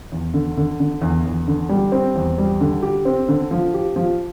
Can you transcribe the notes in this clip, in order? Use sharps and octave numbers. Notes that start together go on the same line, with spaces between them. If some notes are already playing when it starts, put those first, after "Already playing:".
E2
D3
D3
D3
E2
E2
D3
G3
C4
E2
G3
D3
G4
C4
D3
F3
G4
F3